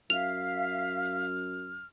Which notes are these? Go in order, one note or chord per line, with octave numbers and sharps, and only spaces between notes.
F#2 E5 F5 F6 F7